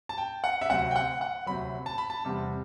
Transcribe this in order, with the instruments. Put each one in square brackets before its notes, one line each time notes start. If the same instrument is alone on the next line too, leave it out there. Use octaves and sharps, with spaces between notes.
[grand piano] A5
G5
F#5
E5
D2 C3 F#3 F#5
G5
F#5
F#5
D2 C3 F#3 B5
A5
B5
A5
E2 C3 G3